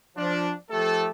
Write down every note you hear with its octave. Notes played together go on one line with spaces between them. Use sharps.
F3 D4
F3 A3 G4 A4